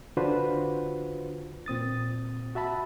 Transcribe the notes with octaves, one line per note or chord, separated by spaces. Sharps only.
D3 D4 F4 F#4 B4 C5
A#2 C4 D#6 A6
F#4 E5 A5 B5